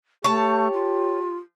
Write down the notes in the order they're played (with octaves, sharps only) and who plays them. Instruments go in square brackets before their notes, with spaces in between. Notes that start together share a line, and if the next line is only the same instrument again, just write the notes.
[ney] A3 [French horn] G4 [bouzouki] C#5 A5
[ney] F4